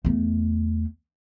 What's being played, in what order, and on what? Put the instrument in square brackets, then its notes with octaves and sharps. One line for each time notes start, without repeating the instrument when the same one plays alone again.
[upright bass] E2 A3